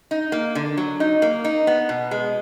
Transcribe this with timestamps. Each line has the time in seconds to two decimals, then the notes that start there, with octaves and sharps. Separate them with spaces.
0.11 D#4
0.32 A#3
0.55 D3
0.77 F#3
1.00 D#4
1.22 A#3
1.44 D#4
1.67 B3
1.89 B2
2.11 G#3